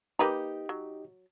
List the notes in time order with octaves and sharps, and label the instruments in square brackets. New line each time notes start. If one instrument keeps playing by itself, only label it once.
[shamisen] A#3 B4 A#5 [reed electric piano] D#4 G4 D#5
[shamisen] F#3